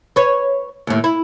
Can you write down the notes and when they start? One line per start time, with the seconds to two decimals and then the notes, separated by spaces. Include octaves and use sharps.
0.16 B4 C#5
0.87 D#2 A2
1.04 E4